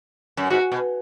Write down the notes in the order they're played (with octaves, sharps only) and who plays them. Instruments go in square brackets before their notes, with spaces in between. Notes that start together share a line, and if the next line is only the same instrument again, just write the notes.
[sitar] F#2
[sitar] G#2 [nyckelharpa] F#4
[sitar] B2